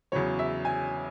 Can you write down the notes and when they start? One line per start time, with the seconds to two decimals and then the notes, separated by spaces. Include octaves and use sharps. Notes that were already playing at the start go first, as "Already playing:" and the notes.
0.12 E2 C#3 F#3 C#5
0.39 E5
0.65 G#5